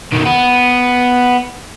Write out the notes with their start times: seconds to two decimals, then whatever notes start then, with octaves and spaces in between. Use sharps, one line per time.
0.12 B1 D#3
0.25 B3